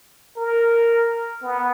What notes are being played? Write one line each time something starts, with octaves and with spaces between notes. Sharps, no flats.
A#4
B3